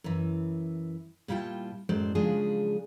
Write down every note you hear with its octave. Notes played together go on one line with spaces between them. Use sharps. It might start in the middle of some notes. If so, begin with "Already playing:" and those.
F#2 E3
A#2 G3 E4 F4 G5 A5
F#2 A2 G#3 C5 D5
C#3 F3 F#3 G#3 D4 G#4